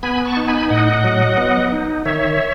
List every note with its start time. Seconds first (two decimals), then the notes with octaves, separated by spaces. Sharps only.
0.03 B3 G#5 B5
0.25 A5 C#6
0.37 D#4
0.47 G#5 B5
0.70 A2 D#5 F#5
1.04 F#3
1.38 B3
1.72 D#4
2.05 D#3 C#5 E5